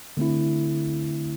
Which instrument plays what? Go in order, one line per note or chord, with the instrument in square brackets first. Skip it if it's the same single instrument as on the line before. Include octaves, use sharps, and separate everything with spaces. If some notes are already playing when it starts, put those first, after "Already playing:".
[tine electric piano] D3 A3 C4 E4